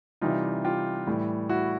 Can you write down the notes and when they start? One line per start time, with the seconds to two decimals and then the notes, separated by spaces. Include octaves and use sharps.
0.21 C3 E3 G3 D#4 F4
0.64 F4 G4
1.07 A2 E3 G3
1.49 E4 F#4